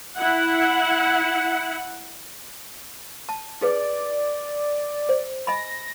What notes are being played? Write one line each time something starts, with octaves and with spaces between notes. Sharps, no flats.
E4 F#5
A5
D#4 G#4 B4 D5
C5
D#5 G#5 B5 A#6